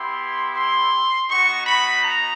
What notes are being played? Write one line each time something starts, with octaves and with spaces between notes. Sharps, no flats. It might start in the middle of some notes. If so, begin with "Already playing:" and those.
Already playing: B3 E4 G4 C6
C6
B3 D#4 F#4 C#6
B5
A#5